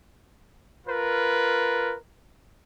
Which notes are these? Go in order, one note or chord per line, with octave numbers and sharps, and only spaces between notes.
F4 A#4 B4